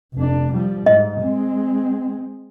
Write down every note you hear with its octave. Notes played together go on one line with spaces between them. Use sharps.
F1 D4
F3 G3
G#2 D#5
G#3 C4